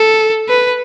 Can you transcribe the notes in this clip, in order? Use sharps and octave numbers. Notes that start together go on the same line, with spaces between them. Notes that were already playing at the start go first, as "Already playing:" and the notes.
Already playing: A4
B4